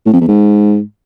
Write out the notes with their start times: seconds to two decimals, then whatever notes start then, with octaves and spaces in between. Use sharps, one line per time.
0.06 A2
0.13 F2
0.21 E2
0.28 G#2